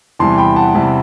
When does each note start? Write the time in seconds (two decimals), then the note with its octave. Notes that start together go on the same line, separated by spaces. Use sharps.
0.19 E2 C3 E3 G3 A5 C6
0.38 G5 B5
0.56 F#5 A5
0.75 E2 C3 E3 G3